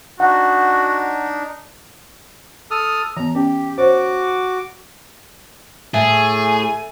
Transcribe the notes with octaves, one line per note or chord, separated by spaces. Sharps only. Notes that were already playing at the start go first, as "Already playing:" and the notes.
D4 D#4 F#4 F#5
A4 D#6 F6
E3 B3 A#5
C#4 G4
F#4 C5 C#5 D6
A2 G#4 E5 G#5